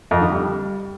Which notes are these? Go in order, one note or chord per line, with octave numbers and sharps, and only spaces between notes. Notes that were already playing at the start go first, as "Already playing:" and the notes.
F2
D3
G3